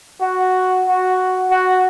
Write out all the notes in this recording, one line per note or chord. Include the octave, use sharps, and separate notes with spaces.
F#4
F#4
F#4